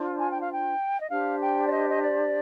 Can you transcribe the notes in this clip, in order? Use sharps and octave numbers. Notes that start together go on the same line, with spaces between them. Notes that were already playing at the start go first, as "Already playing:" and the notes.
Already playing: D4 F4 C5
G#5
G5
F5
G5
D#5
D4 G4 C5 F5
G5
D5
D#5
D#5
D5